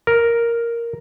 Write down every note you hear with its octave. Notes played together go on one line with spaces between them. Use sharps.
A#4